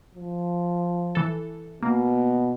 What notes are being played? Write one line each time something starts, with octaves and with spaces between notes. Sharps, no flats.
F3
E3 A4
B2 A#3